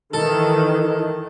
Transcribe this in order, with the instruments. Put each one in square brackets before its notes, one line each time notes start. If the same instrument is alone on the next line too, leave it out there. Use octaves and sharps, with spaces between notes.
[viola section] D#3 E3 [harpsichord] A4